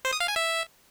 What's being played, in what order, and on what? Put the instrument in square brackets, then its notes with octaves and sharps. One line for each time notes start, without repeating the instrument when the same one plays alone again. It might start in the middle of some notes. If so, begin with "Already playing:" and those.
[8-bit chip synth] C5
D#6
F5
G#5
E5